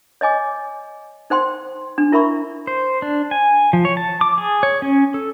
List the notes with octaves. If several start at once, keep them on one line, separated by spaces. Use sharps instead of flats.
C#5 D#5 G#5 D6
D#4 C5 G5 C6
D4
E4 A#4 E5 B5 C#6
C5
D4
G#5
F3
C#5
A5
D6
G#4
C#5
C#4
A4